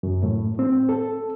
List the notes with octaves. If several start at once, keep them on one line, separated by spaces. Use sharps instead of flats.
F#2
A2
C4
A4